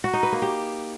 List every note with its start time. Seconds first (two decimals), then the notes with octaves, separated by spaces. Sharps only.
0.04 F#4
0.13 D#4
0.23 B4
0.32 A#3
0.42 G4